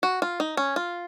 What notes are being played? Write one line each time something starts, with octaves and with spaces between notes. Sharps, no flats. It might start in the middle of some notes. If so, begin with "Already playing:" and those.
F#4
F4
D#4
C#4
F4